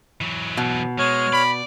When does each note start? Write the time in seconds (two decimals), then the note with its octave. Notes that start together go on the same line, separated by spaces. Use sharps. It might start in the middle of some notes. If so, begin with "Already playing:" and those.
0.21 E3 F#3
0.57 B2
0.99 G#3 C#5 F6
1.33 D5 B5